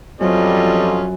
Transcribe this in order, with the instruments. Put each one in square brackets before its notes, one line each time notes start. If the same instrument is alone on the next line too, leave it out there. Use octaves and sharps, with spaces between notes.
[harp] F#2 [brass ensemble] F3 G3 C4 [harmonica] C#4 F4 D#5 [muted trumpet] A4